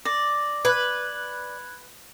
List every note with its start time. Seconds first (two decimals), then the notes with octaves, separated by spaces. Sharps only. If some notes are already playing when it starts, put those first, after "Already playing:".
0.05 D5 A#6
0.65 B4 F#6 G#6